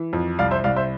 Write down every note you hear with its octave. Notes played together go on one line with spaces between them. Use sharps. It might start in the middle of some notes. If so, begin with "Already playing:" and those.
Already playing: E3
F2
C2 D5 F5
C5 E5
C2 D5 F5
C5 E5